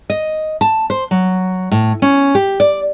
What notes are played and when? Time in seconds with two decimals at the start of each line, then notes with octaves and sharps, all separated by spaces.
0.10 D#5
0.61 A5
0.90 C5
1.11 F#3
1.71 A2
2.02 C#4
2.35 G4
2.60 D5